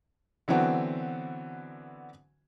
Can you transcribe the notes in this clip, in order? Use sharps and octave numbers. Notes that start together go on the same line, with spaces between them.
D3 E3 F#3 B3 C4 F#4